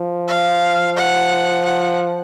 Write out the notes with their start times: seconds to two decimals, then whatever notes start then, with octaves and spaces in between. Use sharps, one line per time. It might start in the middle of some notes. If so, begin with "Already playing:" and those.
Already playing: F3
0.28 F5
0.97 F#5
1.65 F#5